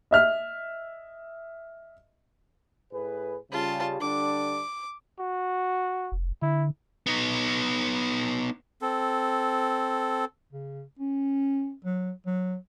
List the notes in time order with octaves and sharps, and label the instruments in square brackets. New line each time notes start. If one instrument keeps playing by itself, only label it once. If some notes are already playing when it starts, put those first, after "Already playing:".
[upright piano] D#5 E5 F6
[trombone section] A2 G#4 B4
[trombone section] C#3 G3 [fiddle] F4 A5
[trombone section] D3 G3 D4 [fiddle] D6
[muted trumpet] F#4
[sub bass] F1
[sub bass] D3 [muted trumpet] E4
[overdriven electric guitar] B3 D#4
[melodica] C4 A4
[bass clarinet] C#3
C#4
F#3
F#3